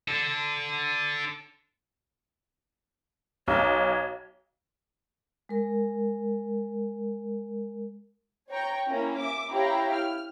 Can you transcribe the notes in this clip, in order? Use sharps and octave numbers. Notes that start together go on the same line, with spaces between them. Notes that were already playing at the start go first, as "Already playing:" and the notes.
D4 A4
B1 C#5
G#3 A#4
C#5 G5 A#5 C#6
A#3 C#4 E4 A#5
E5 D6
E4 G4 C#5 F5 G5 A#5
F6